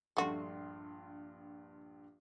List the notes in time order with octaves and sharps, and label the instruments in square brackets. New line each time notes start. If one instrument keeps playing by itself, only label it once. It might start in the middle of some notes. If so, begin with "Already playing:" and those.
[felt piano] A#1 G2 C6 [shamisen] A3 F#4